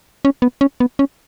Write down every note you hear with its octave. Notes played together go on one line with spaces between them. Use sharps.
C#4
B3
C#4
B3
C#4